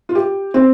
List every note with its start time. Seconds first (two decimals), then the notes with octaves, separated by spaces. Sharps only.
0.09 F4
0.15 G4
0.54 C4